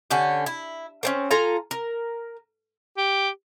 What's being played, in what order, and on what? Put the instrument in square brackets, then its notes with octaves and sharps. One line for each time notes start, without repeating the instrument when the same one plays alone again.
[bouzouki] D3 C#4 G4
E4
A#3 C4 C#4
F4 A4 G#5 A#5
A#4
[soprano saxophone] G4